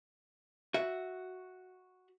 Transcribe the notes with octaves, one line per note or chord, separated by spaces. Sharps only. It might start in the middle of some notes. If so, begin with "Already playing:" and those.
F#4 E5